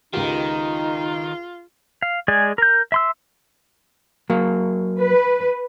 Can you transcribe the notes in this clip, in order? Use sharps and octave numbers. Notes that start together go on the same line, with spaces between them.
C#2 D#3 D#4 F4 G4
F5
G#3 G#4 D5 G#5
A#4 G6
E5 C6 E6
F#3 A#3
B4